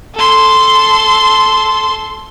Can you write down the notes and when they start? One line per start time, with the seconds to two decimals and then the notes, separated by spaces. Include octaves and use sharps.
0.16 A4 C6